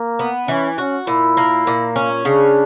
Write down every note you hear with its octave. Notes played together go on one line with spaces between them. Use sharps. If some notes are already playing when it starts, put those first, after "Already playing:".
Already playing: A#3
B3
E3 C#4
C#4 F#4
A#2 E4
A#3
A#2
C#4
C#3 D4